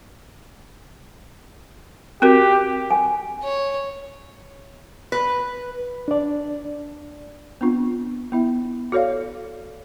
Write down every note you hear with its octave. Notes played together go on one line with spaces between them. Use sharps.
C4 F#4 G4 A#4
G#5
C#5
B4
D4 D5
B3 C4 D4 F4
B3 E4 E5
F#4 A4 C#5 D5 F5